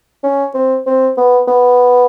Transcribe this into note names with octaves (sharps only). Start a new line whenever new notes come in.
C#4
C4
C4
B3
B3